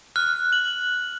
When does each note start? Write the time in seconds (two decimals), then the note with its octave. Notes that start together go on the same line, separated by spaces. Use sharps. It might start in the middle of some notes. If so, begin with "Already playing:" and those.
0.16 F6 F#6
0.53 F#7